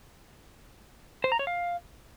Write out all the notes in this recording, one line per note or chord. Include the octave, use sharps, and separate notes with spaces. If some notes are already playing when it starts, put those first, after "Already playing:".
C5
A#5
C#5
F5